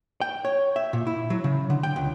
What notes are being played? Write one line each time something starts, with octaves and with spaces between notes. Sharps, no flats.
G5
C#5
E5
A#2
E4
F#3
C#3
D3
G5
C#2